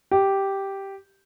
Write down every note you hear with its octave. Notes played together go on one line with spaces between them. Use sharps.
G4